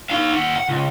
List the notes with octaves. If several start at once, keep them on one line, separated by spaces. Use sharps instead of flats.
D#4 F5
D#2 F#5
F#5
C#2